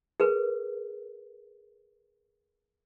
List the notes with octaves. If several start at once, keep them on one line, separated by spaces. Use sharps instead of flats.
G#4 A#4 B4